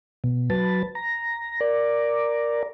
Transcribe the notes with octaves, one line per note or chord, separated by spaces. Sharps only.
B2
F#3 B4 A5
A#5
A#4 D5